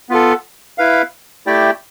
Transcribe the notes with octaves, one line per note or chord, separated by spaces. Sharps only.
B3 F4 A4
E4 B4 F5
A3 E4 G4 D5 G5